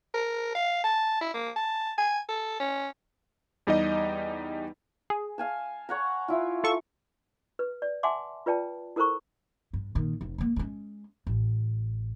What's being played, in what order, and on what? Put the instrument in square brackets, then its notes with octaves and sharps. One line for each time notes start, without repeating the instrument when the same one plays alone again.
[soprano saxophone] A#4
F5
A5
E4
A#3
A5
G#5
A4
C#4
[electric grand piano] E2 G3 D#4 G4 D#5
[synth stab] G#4
[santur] F5 G#5 A5
C#5 F#5 A#5
E4 F4
[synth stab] F4 A4 C#6
[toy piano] B4
D5
E5 F#5 G#5 A5 C6 D6
F4 B4 D5 G5 A5
E4 A4 A#4 C5 A#5 C#6
[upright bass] G2
A#2 D#3
F1
G#3 A#3
G#3 C#4
A1